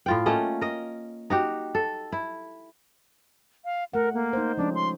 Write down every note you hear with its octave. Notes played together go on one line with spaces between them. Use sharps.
A2 F4 G5
A3 A#3 C#4 D#5
A#4 D#5
D#4 F#4 G4
A4
E4
F5
A3 A#4 F#5
A#3
D#4 C5
F3 G#3 C#4 D4
C6